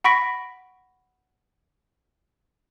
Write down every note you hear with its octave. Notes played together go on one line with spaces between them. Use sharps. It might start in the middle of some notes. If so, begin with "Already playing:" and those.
F#5 B5 C#6 A#6 B6 D7